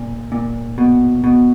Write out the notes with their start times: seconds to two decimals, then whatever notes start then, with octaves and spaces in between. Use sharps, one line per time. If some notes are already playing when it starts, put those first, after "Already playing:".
Already playing: A#2
0.32 A#2
0.78 B2
1.24 B2